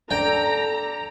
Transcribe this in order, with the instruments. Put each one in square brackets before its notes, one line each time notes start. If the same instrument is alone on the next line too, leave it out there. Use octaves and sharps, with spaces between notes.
[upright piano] D4 [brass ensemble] A4 [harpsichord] G5 [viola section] A#5